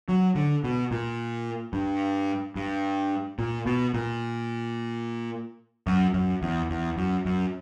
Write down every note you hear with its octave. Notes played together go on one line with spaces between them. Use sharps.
F#3
D3
B2
A#2
G2
G2
A#2
B2
A#2
F#2
F#2
E2
E2
F#2
F#2